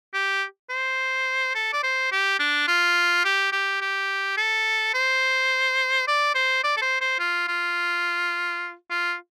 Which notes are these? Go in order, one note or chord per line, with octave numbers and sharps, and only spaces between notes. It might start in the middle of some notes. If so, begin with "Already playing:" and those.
G4
C5
A4
D5
C5
G4
D4
F4
G4
G4
G4
A4
C5
D5
C5
D5
A4
C5
C5
F4
F4
F4